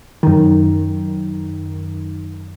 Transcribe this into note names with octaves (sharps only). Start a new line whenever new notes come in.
F#2 D#3